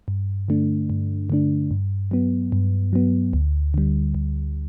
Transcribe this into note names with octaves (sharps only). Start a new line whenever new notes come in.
G2
D3 A3 D4
G2
D3 A3 D4
G2
F#3 B3
G2
F#3 B3
D2
D3 G3
D2